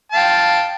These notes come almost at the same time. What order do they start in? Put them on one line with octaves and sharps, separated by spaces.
A5 F5 G5